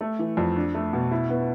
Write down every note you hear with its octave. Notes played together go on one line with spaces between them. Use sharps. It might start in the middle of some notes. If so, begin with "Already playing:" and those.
A3
E3
F2
D4
A3
B2
E4
B3